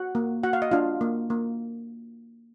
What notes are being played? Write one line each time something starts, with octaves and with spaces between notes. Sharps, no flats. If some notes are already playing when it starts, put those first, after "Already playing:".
Already playing: F#4 F#5
A#3
F#4 F#5
F5
D#5
D4 F4 F5
A#3
A#3